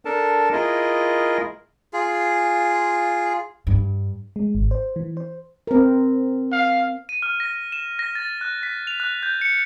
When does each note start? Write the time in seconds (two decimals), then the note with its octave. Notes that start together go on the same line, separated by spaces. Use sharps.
0.05 D4 A4 A#4 A5
0.52 E4 F4 G#4 A#4 D#5
1.93 F4 G#4
3.67 G2
4.36 G#3
4.55 G#1
4.71 C5
4.96 E3
5.17 C5
5.67 C4 A#4
6.52 F5
7.09 D#7
7.22 F6
7.40 A#6
7.72 E7
7.99 A#6
8.15 A6
8.41 F#6
8.63 B6
8.87 F7
9.00 F#6
9.23 G6
9.41 C#7